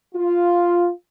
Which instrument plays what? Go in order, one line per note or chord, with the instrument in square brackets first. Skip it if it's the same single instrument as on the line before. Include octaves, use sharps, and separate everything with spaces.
[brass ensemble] F4